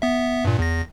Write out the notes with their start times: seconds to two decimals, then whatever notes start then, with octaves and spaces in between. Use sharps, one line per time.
0.02 B3 E5
0.45 G2 A#2
0.59 E2 A#6